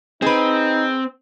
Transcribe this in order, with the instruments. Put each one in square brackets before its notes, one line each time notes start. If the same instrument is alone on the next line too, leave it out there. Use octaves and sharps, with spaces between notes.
[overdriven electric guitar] C4 [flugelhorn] D#4 [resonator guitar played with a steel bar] G#4 B4